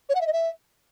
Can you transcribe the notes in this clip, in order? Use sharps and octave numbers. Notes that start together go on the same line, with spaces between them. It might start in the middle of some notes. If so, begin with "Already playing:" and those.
C#5
F#5
E5
D#5
E5